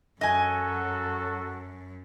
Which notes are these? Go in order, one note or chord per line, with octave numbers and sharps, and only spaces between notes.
F#2 F#3 F#4 A4 D#5 G#5